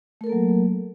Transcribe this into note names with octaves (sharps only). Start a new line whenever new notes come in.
F#3 A3 A#3 A4 A#4